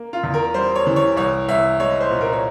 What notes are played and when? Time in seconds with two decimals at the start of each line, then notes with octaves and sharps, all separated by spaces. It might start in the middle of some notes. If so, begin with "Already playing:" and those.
Already playing: A#3
0.13 F4
0.23 E2
0.34 A#4
0.54 G3 C5
0.75 C#5
0.87 E3
0.96 C#5
1.17 C2 C#5
1.48 C2 E5
1.79 G#3 C#5
2.01 C5
2.11 A#2
2.21 A#4
2.33 C#5